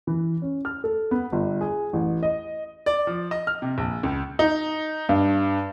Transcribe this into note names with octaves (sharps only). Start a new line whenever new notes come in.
E3
C#4
F6
A4
B3
G1
G#4
A1
D#5
D5
F3
D#5
F6
C3
A#1
C#2
D#4
G2